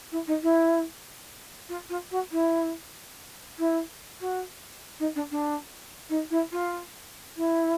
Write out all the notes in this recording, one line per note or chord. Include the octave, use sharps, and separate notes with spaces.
E4
D#4
E4
F4
F4
F#4
E4
E4
F#4
D#4
D4
D4
D#4
E4
F4
E4